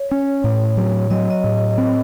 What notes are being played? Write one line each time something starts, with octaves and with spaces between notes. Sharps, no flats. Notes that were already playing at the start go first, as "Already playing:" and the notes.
Already playing: C#5
C#4
A2
F#3
F#3 D#5
D#5
A2
C4